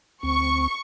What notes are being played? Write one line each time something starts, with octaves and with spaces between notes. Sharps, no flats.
D2 C4 C#6